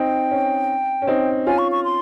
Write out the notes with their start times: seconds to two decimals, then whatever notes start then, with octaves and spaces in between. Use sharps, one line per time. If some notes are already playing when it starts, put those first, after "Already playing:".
Already playing: C4 D#4 G5
0.31 C#4
1.02 C#4
1.07 C4 D#4
1.46 C#4 F4 G#5
1.58 C#6
1.72 C#6
1.84 C6